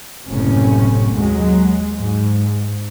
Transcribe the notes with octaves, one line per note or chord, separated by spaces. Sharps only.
F#1 A2 C3 C#4
D#2 F#3 G#3
G#2